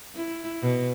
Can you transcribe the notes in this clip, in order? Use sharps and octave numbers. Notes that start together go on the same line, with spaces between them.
E4
B2